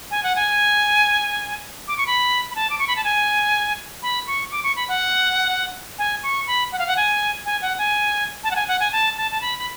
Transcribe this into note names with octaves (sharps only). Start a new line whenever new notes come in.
G#5
F#5
G#5
D6
C#6
B5
B5
A5
D6
C#6
B5
A5
G#5
B5
C#6
D6
C#6
B5
F#5
G#5
C#6
B5
F#5
F5
F#5
G#5
G#5
F#5
G#5
A5
F#5
G#5
F#5
G#5
A5
A5
A5
B5
B5